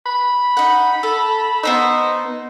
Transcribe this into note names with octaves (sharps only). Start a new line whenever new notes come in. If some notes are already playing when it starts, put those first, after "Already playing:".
B5
D#4 F#5
A4
B3 D#4 C5 E6